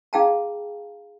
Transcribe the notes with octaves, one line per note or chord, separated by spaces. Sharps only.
D#4 G#4 F5 G5 A5 A#5